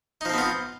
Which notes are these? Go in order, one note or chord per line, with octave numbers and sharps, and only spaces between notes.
F3 B3 C4 D#4 F4